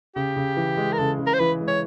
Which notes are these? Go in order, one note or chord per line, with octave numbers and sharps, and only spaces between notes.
C#3 G4
C#3
E3
G#3
A#4
C#3 A4
C#3
A#4
C5
E3 B4
G#3
C#5